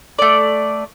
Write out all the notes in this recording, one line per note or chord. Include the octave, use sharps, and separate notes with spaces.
A3 D5